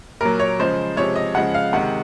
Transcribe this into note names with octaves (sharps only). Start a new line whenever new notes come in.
A#2 F#3 A#4
C#5
C#3 F3 G#3 C5
C3 F3 G#3 C#5
D#5
C#3 F3 G#3 F#5
F5
C3 D#3 G#3 F#5